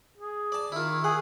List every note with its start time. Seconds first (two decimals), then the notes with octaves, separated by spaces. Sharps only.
0.18 G#4
0.52 D5 A5
0.72 D#3 E4 F4
1.04 G#4 F#5